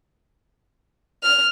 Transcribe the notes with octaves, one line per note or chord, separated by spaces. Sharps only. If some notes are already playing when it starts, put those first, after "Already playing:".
F6